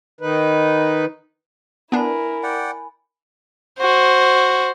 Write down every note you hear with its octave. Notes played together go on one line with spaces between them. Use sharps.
D#3 D#4 B4
B3 D4 E4 A#4 G#5 B5
D5 F#5 G5
F#4 C5